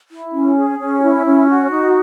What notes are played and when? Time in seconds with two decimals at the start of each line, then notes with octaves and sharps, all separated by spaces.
0.11 E4
0.33 C#4
0.56 G#4
0.79 C#4
1.02 E4
1.25 C#4
1.48 F#4
1.70 D#4